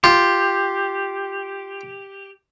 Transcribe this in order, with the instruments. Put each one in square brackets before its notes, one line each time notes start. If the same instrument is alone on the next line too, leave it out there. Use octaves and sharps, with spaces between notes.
[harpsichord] F4 [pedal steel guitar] G4